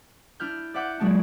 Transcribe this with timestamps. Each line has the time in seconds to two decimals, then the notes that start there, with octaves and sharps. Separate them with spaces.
0.40 D4 E4 F6 G6
0.74 D5 E5 F#5 D6 G6
0.99 A#2 F#3 G#3 D4 A5